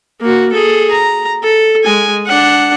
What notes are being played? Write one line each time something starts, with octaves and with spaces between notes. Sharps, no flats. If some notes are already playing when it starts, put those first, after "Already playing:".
A#3 F#4
G#4 A4
A#5
A4
G#3 G#5
D4 F#5